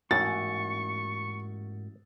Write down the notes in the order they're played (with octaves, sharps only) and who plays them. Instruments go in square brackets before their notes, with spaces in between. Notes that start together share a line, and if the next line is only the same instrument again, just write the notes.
[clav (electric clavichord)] A1 [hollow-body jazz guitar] G#2 A#3 F#4 [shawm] C#6 [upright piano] A6